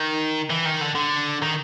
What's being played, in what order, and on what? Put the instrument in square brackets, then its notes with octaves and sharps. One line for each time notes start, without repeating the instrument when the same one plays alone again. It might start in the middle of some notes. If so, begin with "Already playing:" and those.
Already playing: [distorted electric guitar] D#3
E3
D#3
D3
D3
D#3